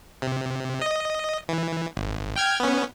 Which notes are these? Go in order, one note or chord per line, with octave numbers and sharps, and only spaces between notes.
C3
D#5
E3
G#1
G5 F6 G#6
B3 C#4